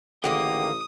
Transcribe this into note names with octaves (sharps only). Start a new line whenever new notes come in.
A1 D3 D#3 A#3 G#4 F#5 G5 D#6